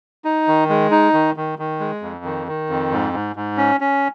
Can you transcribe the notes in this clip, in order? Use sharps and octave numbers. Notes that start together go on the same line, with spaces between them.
D#4
D#3
G#3
D#4
D#3
D#3
D#3
G#3
F2
D#3
D#3
F2
G#2
G#2
G#2
C#4
C#4